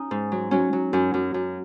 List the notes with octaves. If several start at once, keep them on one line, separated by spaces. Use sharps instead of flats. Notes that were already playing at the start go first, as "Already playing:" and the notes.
Already playing: C#4 D#4
G#2
F#3
F#3 C#4
F#3
F#2 C#4
F#2
F#2